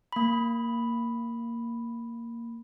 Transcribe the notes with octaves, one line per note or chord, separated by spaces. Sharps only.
A#3 B5